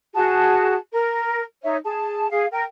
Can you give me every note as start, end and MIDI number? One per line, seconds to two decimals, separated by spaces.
0.15 0.76 66
0.15 0.76 68
0.15 0.76 81
0.92 1.42 70
1.63 1.77 63
1.63 1.77 73
1.63 1.77 76
1.84 2.30 68
1.84 2.30 81
2.30 2.46 68
2.30 2.46 77
2.52 2.62 70
2.52 2.62 79